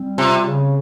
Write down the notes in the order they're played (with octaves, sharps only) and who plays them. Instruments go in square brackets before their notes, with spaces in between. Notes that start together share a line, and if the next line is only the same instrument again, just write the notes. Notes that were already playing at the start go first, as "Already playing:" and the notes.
Already playing: [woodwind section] G3 C4
[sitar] C3 [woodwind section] F4
[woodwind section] C#3